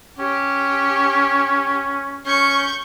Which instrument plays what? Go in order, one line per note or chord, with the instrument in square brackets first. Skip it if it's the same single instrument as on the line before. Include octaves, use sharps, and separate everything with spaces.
[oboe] C#4 [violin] G4
[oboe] C#4 [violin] C#6 G6